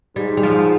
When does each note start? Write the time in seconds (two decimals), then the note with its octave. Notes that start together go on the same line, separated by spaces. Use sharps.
0.16 G#2 G3
0.37 G3
0.43 F3